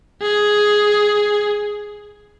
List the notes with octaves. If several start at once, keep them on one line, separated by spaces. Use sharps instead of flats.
G#4